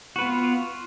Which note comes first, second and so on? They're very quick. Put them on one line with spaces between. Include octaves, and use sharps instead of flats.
F#4 B4 B3 F4